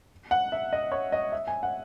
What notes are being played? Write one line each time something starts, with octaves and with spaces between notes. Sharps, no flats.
F#5
E5
D#5
C#5
D#5
E5
G#5
F#5